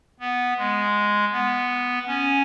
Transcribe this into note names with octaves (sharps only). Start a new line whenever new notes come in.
B3
G#3
B3
C#4